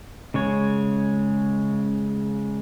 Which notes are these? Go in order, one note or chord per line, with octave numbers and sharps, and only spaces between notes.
C#3 G#3 C#5